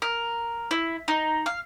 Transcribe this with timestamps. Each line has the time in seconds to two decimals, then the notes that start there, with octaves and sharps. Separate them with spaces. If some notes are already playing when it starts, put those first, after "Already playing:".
0.02 A#4
0.71 E4
1.08 D#4
1.46 F5